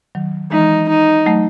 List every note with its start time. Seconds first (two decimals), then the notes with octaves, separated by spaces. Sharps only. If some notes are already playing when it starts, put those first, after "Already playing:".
0.15 D#3 F#3
0.51 E3 G#3 D#4
0.89 D#4
1.26 F#3 A3